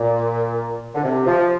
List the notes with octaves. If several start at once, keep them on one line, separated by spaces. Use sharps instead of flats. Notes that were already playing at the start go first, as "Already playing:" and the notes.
Already playing: A#2
D3
C3
F3